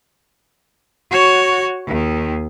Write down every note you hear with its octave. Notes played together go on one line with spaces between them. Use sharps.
F#4 C#5
D#2 D#3